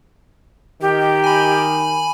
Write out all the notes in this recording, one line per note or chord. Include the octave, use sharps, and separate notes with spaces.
D#3 G4
G#5 B5